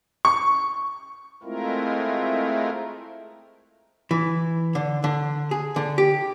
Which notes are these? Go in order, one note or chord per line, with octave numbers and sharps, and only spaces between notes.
C#6
G#3 A3 C4 E4 F4 A#4
E3
D3
D3
G#4
D3
G4